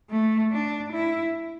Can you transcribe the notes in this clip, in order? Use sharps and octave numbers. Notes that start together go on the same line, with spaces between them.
A3
D4
E4